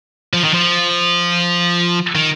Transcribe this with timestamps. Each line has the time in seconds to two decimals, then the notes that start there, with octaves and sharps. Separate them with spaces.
0.33 F3
0.44 D#3
0.54 F3
2.15 D#3